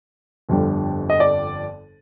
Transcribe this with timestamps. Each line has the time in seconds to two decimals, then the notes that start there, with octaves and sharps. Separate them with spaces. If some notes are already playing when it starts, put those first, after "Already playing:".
0.49 G1 F2 D3 G3
1.10 D#5
1.20 D5